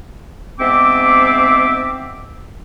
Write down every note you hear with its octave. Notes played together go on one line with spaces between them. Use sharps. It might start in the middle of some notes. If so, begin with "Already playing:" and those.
G#2 B3 C4 E5 D6